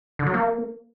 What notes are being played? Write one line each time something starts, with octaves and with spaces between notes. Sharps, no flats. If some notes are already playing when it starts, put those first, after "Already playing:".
D3
F#3
A#3